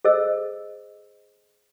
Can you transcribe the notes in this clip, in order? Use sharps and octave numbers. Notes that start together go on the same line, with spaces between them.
G#4 A4 C5 D#5 E6